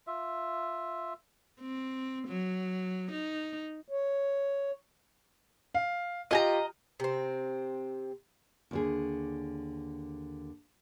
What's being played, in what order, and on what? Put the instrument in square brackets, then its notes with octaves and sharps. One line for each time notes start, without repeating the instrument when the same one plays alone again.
[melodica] F4 E5
[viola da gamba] C4
F#3
D#4
[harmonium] C#5
[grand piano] F5
[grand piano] F4 G4 [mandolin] D#5 G#5 A#5
[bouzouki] C3 C4
[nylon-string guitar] D#2 D3 G#4